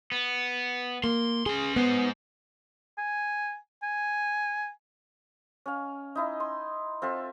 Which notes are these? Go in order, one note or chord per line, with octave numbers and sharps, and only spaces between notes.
B3
A#3 C6
C#4 G#4 C6
G#3 B3 C5
G#5
G#5
C#4 F5
D#4 E4 D#5
C6
C4 F4 A4 E5